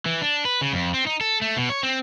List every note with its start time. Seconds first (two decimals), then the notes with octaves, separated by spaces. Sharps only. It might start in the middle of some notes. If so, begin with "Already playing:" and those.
0.06 E3
0.22 D4
0.45 B4
0.61 C#3
0.73 F2
0.94 C4
1.07 D#4
1.21 A4
1.42 A3
1.56 B2
1.70 C#5
1.83 C4